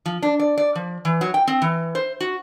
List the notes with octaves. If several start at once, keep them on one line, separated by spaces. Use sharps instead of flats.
F3
D4
D5
D5
F3
E3
F#3
G5
C4
E3
C5
F#4